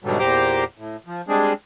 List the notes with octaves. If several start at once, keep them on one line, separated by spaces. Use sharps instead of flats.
G#2 B2 D3 F#3 G3 A3
E2 A#2 G4 C5 A#5 D6
A2
F3
G3 G#3 C4 D4 G#4